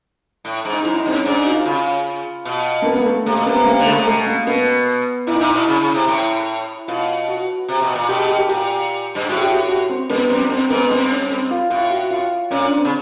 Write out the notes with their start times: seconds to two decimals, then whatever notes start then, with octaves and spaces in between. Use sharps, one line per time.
0.45 A2
0.65 G#2
0.73 D#4
0.85 F#2 E4
0.98 D#4
1.05 G2 C4
1.11 C#4
1.25 G#2 D4
1.39 D#4
1.46 F#4
1.52 F4
1.65 C#3 F4
2.45 B2
2.82 A#3
2.86 B3
3.00 A#3
3.06 A3
3.26 C3 A#3
3.36 B2
3.46 C3 B3
3.66 A#3
3.80 D3
3.86 C#3 A3
3.97 C3
4.06 B2 A3
4.27 A#3
4.47 B2 B3
5.27 A#2 E4
5.34 D#4
5.40 A#2 E4
5.54 B2
5.68 C#3
5.81 C#3
5.94 C3
6.08 A2
6.88 B2 F4
7.28 F#4
7.68 C3
7.82 B2
7.95 A#2
8.09 B2 G4
8.19 G#4
8.29 G4
8.39 G4
8.49 A#2 G4
9.15 G2
9.22 G#2
9.29 A2 F#4
9.38 G#4
9.42 G4
9.50 F#4
9.56 G4
9.69 F#4
9.89 C4
10.10 G2 B3
10.30 F#2 C4
10.49 G2 C4
10.70 G#2 B3
10.90 G2 C4
11.10 C#4
11.30 C4
11.51 F4
11.70 A2 F4
11.90 F#4
12.11 F4
12.51 A#2 C#4
12.61 C#4
12.64 D4
12.78 C4
12.84 C#3